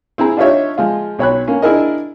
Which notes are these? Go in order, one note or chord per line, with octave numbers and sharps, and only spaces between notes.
C4 E4 G#4 A#5
D4 D#4 F4 G4 C#5 E5
F3 G#3 F4
B1 C#5 B5 F#6
A#3 C#4
D4 E4 G#4 A#4 D#5